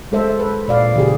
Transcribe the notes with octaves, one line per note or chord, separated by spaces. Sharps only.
G#3 A4 C5 E5
B4
A#2 D5 F5
C#3 E3 G4 G#4